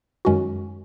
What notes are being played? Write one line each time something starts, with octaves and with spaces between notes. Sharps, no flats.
F#2 D#3 G#3 C#4 F#4